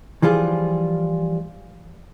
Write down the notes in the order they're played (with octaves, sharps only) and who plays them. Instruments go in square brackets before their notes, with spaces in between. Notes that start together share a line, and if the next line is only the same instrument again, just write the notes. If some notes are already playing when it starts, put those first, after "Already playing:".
[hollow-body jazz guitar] E3 F3 G3 F4 G#4